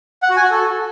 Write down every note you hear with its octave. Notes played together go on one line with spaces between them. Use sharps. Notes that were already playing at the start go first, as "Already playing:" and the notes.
F#5
F#4
G#5
F#4
A4